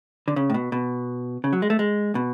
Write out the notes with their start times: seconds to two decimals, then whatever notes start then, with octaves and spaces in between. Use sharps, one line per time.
0.28 D3
0.36 C#3
0.50 A2
0.54 B2
0.72 B2
1.44 C#3
1.53 F#3
1.62 G#3
1.70 A3
1.79 G#3
2.15 B2